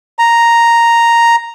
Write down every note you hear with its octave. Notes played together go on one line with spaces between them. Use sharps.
A#5